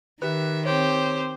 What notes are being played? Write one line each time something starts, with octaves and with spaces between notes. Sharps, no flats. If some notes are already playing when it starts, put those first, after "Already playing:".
D#3 G4 B4 E5
C4 G4 C5 C#5